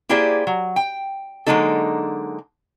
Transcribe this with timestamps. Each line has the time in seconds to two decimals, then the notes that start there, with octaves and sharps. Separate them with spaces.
0.09 A#3 E4 G4 G#4 C5 D5
0.47 F#3
0.76 G5
1.46 D3 F#3 G#3 A#3 D#4 A4